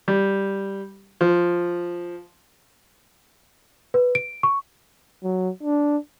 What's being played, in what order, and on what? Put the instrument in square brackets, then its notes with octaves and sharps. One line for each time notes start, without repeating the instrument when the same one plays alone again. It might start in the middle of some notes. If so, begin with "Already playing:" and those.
[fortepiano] G3
F3
[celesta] B4
D7
C#6
[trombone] F#3
D4